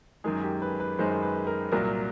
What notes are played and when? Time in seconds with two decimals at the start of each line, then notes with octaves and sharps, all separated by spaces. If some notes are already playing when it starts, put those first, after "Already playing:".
0.24 F#2 D#3 G#3 G#4
0.43 G4
0.62 B4
0.80 B4
0.99 F#2 D#3 G#3 C5
1.22 B4
1.47 A#4
1.72 C2 A#2 F#3 A#4